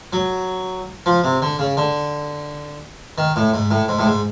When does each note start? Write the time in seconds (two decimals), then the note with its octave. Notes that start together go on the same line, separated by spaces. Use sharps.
0.13 F#3
1.06 F3
1.24 C3
1.42 D3
1.59 C#3
1.77 D3
3.18 D#3
3.36 A2
3.54 G#2
3.71 A2
3.88 G#2
3.99 A2
4.06 G#2